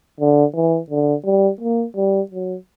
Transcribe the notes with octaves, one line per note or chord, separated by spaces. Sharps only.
D3
E3
D3
G3
A#3
G3
F#3